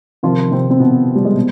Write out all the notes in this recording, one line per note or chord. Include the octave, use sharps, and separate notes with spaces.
C3 D#3 F3 F4
C3 C4
C4
B2 B3
G3
G#3
B2